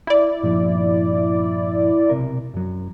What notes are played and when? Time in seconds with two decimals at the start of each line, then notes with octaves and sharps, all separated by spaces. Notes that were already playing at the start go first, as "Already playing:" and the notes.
0.07 E4 D5
0.43 G2 A#2 F3
2.10 B1 C3 A#4
2.54 F#2 F#3